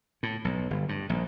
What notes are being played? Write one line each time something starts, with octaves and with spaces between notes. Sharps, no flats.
A2
B1
G1
G2
A#1